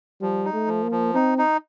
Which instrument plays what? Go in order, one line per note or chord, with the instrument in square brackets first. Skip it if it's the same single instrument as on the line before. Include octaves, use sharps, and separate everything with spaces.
[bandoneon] F3 [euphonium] G3
[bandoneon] D#4
[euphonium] A3
[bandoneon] F3
[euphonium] A#3
[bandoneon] F3
[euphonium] C4 [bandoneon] D#4
[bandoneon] D#4